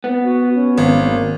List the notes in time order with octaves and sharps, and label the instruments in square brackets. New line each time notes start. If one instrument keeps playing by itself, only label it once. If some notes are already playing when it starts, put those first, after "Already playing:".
[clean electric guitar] B3
[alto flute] F#4
C#4
[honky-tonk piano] G#1
[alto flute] A#3